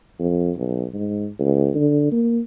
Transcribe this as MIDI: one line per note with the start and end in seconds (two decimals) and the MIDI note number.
0.19 0.52 41
0.57 0.85 35
0.93 1.28 44
1.39 1.70 37
1.75 2.11 50
2.12 2.40 58